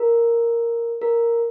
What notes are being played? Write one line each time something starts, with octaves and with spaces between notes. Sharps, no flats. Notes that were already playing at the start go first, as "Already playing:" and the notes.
Already playing: A#4
A#4